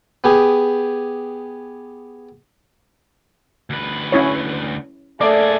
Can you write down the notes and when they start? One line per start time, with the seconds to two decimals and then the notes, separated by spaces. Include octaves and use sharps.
0.24 B3 G4 G#4
3.70 D2 B4
4.12 C#4 E4 C#5
5.21 A3 A#3 G#4 D5